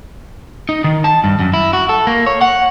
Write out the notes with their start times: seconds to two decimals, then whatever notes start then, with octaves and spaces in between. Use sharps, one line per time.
0.69 D#4
0.84 D#3
1.04 A5
1.24 G2
1.39 F#2
1.54 E4
1.73 F#4
1.89 A4
2.07 A#3
2.26 C#5
2.41 F#5